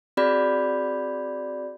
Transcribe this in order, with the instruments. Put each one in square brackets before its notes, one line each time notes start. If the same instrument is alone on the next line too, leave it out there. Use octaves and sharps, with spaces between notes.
[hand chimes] C4 F#4 G#4 D5 B5 G6